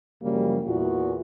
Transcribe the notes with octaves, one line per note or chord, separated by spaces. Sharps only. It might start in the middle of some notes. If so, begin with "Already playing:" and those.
F#2 C#3 F3 G3 A#3
E2 A#2 E3 F4 F#4